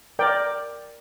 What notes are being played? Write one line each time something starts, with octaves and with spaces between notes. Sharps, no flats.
A#4 D5 G5